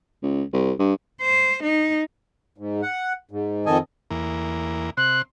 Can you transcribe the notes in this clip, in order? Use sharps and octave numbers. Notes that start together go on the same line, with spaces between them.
C#2
C2
G2
C5
D#4
G#2
F#5
G#2
F2 D#3 A4 D#5 G#5
E2 A#3
C3 C6 F#6